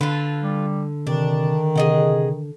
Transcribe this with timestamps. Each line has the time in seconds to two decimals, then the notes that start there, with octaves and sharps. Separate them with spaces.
0.01 D3 F4 A4 B4
0.43 G3
1.07 C3 D#3 D4
1.75 C3 G#4 D#5 F#5